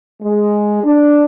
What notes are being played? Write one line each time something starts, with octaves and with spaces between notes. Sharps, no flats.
G#3
D4